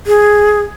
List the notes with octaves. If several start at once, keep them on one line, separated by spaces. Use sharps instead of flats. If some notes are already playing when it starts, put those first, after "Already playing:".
G#4